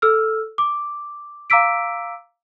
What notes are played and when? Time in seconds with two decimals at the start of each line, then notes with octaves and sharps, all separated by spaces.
0.02 A4 E6 F6
0.58 D6
1.50 F5 A#5 D6 E6 B6 D7